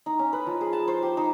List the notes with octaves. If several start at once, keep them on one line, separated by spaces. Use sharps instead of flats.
D#4
C#4
B4
F3
G#4
A5
C5
G4
D#4